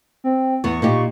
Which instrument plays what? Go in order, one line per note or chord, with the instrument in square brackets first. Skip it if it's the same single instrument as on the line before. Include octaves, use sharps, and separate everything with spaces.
[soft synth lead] C4
[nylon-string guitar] E2 B3 [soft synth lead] C#6
[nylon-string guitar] A#2 D#4 G4